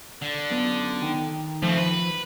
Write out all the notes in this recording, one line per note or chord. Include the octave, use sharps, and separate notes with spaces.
D3
F#2 B3 F4
D#3 G5
F3 A3 C4
B4